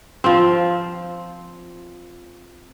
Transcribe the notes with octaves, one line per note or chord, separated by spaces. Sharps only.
F3 C4